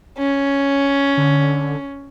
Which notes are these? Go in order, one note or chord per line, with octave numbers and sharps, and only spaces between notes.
C#4
D3